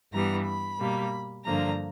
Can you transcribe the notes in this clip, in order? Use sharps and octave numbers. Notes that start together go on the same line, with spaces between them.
G2 E3 G3 B3 A#5
B5
B2 G3 A#3
G2 D3 F3 A#3 A#5